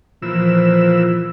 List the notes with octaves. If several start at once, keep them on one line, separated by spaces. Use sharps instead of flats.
A#2 E3 F3 E6